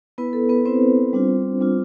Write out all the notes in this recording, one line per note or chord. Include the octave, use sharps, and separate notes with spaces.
B3 E4 B4
A4
B3 B4
B3 C4 E4 C5
G3 D4 F4
G3 D4 F4